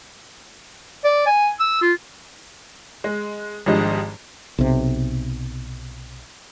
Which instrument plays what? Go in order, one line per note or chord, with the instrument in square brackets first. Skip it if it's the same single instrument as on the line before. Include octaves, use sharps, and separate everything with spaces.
[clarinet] D5
G#5
E6
F4
[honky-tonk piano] G#3
G#1 F3 G3 G#3 D4 D#5
[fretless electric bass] B1 C3